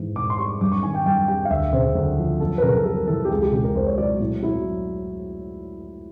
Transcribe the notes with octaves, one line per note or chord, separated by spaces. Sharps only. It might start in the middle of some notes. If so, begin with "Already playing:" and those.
Already playing: G#2 E3
G#2 D6
C6
G3 C#6
G2 D6
C#6
D#3 G#5
G5
G2 G5
G3 G5
F5
D2 E5
C#3 C5
D2
F3
F#2 A4
B4
C#3 A#4
A4
G3 A#4
E3 A4
G4
C#2 G#4
G4
C#3 G4
A#4
C#2 C5
C#5
F#3 D5
A2
F#3 E4